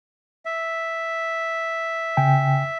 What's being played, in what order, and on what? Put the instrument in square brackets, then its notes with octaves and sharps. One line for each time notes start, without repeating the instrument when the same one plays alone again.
[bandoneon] E5
[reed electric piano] C#3 G5 G#5